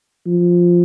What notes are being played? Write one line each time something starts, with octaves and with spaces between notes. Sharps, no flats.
F3